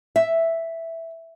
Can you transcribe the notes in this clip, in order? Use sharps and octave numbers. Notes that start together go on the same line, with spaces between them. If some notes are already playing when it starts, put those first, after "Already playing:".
E5